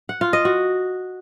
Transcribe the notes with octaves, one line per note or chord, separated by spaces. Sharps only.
F#5
F4
D#5
F#4